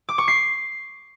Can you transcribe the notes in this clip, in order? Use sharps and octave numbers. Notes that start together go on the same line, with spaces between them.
D6
C#6
C7